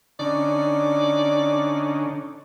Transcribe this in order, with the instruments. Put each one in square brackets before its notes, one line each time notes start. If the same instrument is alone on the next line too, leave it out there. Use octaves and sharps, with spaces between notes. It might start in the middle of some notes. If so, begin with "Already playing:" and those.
[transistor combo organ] D3 C#4 D#4 [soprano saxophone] D5